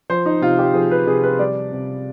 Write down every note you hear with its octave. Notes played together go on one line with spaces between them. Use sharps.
F3 C5
D#4
C3 F4
G4
F3 G#4
B4
C3 G#4
B4
G3 D5
C3